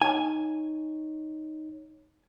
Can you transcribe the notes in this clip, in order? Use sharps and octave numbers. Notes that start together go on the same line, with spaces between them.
D#4 C#5 G#5